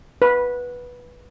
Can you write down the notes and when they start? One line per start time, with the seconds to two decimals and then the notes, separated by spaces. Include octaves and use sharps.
0.22 B4